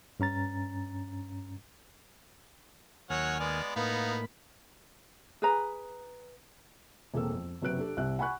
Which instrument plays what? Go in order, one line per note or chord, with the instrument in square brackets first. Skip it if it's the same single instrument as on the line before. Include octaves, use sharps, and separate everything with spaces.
[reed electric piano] G2 C#4 A#5 A6
[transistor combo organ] D#2 G#5 F6 [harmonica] F#3 C#5 F#5
[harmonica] G#3 B3 D5
[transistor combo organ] A2 A#3 B5 [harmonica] B3 D#4 F5
[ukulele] G#4 B4 A#5
[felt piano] E1 A#3 C4 A4 E6
F2
F#1 C3 F#3 B4 F#6 D7
D4 G4 A4
C2 C3 E5 F#6
F#5 G#5 B5 C#6 F#6